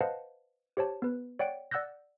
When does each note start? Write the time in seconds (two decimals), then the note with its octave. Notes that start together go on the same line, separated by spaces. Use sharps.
0.01 B4 C5 D#5 F5 F#5 A5
0.77 G4 C5 C#5 A5
1.02 B3 B4
1.39 C#5 D5 F#5 G5 D7
1.71 D5 F#5 E6 F#6 G6 A#6